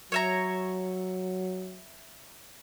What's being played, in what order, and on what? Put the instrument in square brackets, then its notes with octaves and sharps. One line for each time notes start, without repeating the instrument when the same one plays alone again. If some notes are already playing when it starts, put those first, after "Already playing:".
[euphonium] F#3 [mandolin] C#5 E5 A#5